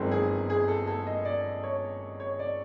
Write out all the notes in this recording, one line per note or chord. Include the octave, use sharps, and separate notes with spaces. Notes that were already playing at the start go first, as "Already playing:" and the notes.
Already playing: G1 F#2 D#3 G#3 C4 A4
G#4
G#4
A4
A4
D#5
D5
C#5
C#5
D5